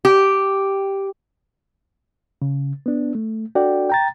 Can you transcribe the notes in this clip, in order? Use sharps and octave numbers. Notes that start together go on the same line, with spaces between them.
G4
C#3
B3 D4
A3
D4 F#4 A4 D5 G5
G5 A#5 A6